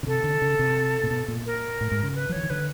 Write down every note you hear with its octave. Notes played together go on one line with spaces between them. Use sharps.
C#3
C3 A4
D3
C#3
C3
A#2
B2
A#2
A#4
A2
G#2
C#3
B4
F3
E3 C#5
D#3
D3 B4